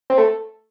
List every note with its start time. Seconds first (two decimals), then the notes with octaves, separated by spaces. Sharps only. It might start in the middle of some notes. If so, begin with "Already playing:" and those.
0.10 C4
0.18 A3